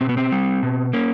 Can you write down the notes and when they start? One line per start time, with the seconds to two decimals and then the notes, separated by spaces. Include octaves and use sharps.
0.01 B2 C4
0.09 B3
0.17 C4
0.32 G3
0.63 B2
0.93 A#3 C#4